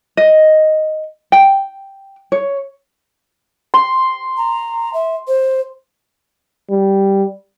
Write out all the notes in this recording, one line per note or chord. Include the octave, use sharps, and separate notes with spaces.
D#5
G5
C#5
C6
A#5
E5
C5
G3